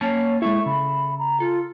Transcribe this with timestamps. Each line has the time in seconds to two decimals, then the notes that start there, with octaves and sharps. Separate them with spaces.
0.01 A#3 C#4 C#5 A5
0.42 G#3 E4 A4 E5 C#6
0.66 C#3 B5
1.19 A#5
1.40 F4 A4